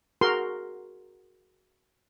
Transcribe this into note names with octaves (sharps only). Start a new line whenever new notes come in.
F#4 G#4 A#4 C6